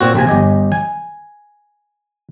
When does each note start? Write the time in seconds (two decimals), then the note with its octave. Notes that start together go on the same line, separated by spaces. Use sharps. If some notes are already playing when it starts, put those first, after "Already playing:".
0.01 A#2 C4 F#4
0.15 A#1 C3 G#5
0.27 G1 G4 D#5 G#5
0.72 G#5